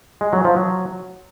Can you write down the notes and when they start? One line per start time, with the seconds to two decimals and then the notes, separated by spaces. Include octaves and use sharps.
0.21 G#3
0.33 F#3
0.45 F3
0.56 F#3